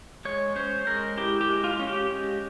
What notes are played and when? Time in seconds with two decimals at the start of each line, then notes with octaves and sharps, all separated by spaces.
0.25 G#3 C#5
0.56 C#4 C5
0.87 G#3 A#4
1.18 E4 G4
1.41 G4
1.49 G#3
1.64 F4
1.79 C#4
1.87 G4
2.10 G#3